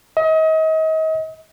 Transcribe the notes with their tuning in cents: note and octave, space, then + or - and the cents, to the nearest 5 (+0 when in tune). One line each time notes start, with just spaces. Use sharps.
D#5 +35